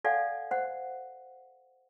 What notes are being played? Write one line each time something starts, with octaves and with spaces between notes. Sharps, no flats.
A4 D5 F5 F#5 G#5
C5 F#5